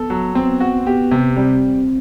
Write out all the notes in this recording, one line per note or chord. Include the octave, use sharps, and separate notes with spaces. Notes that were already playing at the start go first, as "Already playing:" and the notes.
Already playing: B3 A4
F#3
B3 C4
F#4
B3 G4
C3
G3 C4